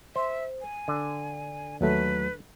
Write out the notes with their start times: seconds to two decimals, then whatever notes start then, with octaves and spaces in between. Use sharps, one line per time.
0.16 C5 E5
0.61 G#5
0.88 D3
1.81 D#2 F#3 A3 B4